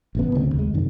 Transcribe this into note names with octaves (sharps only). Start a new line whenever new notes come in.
A1 C#3 B3
D1 D2 C#3 C4
D#2 G#3
F#2 C3 D#3